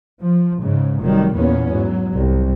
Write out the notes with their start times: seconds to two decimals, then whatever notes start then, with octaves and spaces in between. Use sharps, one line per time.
0.19 F3
0.63 G#2 C#3
1.01 F1 D#3 F#3 G3
1.35 E2 A#2 A#3 B3 C#4
1.71 G#2 F#3
2.15 C2